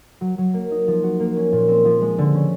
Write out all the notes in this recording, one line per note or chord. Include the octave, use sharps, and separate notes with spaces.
F#3
F#3
A#3
D#4
F3
F#4
A#3
C#4
A#2
C4
F3
G#3
D3
C#4